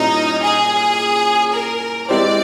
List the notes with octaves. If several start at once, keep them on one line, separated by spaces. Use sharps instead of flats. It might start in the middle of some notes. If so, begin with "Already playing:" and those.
Already playing: A#2 G3 A#3 C#4 D#4 E4
G#4
A#4
G#3 C4 E4 G4 C5 D5